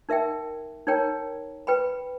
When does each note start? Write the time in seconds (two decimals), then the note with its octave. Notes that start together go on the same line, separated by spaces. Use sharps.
0.09 D#4 A#4 E5 G5
0.87 D#4 A#4 C#5 G5 A#5
1.67 B4 G5 B5